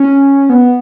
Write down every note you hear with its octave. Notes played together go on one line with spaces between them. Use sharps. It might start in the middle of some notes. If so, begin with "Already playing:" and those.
Already playing: C#4
B3